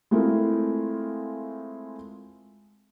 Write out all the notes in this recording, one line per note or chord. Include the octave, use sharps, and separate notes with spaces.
G#3 A3 C4 E4 F4 A#4